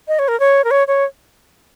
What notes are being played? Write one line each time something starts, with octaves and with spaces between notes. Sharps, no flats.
D#5
C#5
A#4
C#5
A#4
C#5
C#5